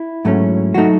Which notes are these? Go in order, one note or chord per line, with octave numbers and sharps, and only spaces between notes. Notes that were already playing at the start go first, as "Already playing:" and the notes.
Already playing: E4
G#2 F#3 A3 C#4
F#3 A3 D#4 F#4